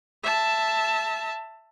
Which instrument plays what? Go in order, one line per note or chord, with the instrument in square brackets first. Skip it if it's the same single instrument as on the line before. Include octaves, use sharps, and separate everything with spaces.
[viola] E5 A5